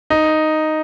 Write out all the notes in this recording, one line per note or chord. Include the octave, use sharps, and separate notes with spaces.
D#4